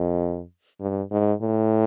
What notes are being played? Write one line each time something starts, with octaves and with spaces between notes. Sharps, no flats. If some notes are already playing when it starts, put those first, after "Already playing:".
Already playing: F2
G2
G#2
A2